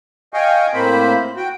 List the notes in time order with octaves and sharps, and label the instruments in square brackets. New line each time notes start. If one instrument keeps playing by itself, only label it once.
[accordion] D#5 F5 G5 G#5 C#6
A2 A#3 C4 C5 B5
F#4 G5